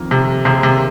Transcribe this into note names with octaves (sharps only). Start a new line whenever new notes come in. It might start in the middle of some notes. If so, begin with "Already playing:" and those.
Already playing: F2 D#3 A#3
C3
D#2 C3 D#3 A#3 G#4 C5
C3